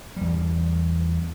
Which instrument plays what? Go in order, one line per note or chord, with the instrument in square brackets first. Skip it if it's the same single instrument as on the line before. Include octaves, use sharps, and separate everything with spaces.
[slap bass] E2 G3